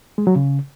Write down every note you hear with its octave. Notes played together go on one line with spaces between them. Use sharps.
G#3
F#3
C#3